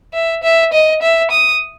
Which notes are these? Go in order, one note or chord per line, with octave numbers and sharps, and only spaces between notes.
E5
E5
D#5
E5
D#6